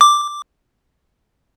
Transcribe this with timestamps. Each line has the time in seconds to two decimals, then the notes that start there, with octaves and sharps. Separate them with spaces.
0.01 D6